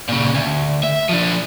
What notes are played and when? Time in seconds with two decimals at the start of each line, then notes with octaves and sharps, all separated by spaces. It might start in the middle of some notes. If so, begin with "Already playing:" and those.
0.09 A#2 C#3
0.34 D2
0.83 E5
1.09 F3 D4